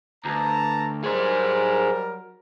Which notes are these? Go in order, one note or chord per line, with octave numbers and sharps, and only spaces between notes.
D2 B4 A5 A#5
F#3 G3 G#4 A#4 C5